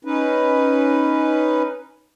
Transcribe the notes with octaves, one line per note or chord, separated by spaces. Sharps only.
C#4 D#4 B4